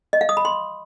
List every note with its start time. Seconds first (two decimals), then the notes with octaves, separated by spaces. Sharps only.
0.13 D#5
0.21 F5
0.29 D#6
0.37 B5
0.45 C6